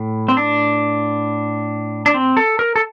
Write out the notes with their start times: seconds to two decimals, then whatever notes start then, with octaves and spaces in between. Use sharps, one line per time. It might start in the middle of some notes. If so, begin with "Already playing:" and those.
Already playing: A2
0.28 C4
0.37 D4
2.06 D4
2.14 C4
2.37 A4
2.59 A#4
2.76 A4